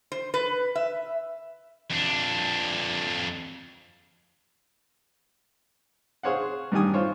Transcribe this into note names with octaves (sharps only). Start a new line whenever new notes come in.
C5
B4
E5
F2 D4
G#4 C5 C#5 F5 F#5
G2 D#3 G4 G#5 D#6
F4 C5 C#5